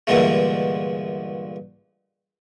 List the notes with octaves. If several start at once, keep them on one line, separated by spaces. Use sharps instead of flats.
G2 A#2 D3 E3 G#3 A3